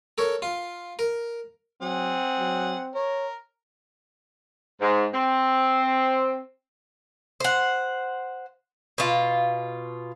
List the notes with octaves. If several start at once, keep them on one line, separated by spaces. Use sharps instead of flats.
A4 A#4 C#5
F4
A#4
F#3 C4 G#4 F#5
F#3
A#4 C#5
G#2
C4
C5 F#5
B2 F4